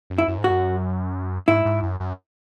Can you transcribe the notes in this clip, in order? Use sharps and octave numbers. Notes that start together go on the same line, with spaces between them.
F#2
E4
F#2
G#2
F#4
F#2
G#2 E4
G#2
F#2
F#2